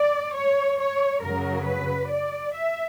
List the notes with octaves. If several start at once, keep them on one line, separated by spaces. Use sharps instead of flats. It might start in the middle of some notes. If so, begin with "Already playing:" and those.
Already playing: D5
C#5
C#5
F#2 C#3 F#3 A#4
B4
D5
E5